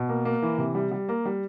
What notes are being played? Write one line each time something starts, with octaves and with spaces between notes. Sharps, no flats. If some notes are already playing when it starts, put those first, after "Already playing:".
Already playing: B2
A#3
A#3
E3
C3
G3
G3
A#3
G3